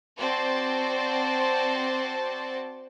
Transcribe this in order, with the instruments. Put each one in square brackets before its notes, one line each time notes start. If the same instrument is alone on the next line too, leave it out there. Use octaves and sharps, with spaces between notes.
[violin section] C4 F#4 C5 D5 A5